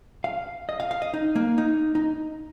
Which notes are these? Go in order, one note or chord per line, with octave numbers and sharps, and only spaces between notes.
F5
D#5
F5
F5
D#5
D#4
A#3
D#4
D#4